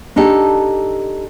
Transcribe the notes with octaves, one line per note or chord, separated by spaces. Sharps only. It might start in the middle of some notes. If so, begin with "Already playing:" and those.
D4 D#4 G4 A4